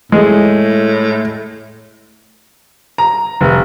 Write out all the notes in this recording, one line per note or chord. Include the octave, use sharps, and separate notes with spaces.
A2 G#3
A#5
F1